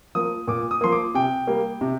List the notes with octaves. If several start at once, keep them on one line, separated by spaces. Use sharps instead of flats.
F3 A#3 D#6
A#2 D6
D#6
F3 A#3 C6
D6
C3 G5
G3 A#3
C3